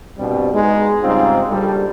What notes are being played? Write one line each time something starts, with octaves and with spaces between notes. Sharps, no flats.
C2 G2 B2 G3 C4
G#3 B3 D#4
G#2 C#3 G3 C4 D#4 F4
A#1 G3 A4